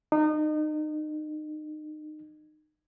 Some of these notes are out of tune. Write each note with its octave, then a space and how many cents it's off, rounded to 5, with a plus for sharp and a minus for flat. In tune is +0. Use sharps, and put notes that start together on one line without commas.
D#4 -30